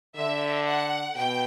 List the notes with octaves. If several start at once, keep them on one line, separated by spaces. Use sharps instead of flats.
D3 E5
F#5
B2 G5